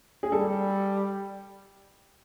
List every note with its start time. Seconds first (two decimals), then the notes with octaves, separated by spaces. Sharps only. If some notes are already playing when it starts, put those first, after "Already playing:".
0.23 G#4
0.32 G3 A4